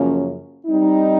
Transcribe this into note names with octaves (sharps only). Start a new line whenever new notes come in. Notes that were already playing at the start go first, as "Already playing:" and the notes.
Already playing: F#2 C#3 F3 A#3 C#4
G3 C4 D#4